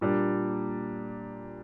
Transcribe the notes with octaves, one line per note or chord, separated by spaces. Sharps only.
A#2 G3 A#3 D4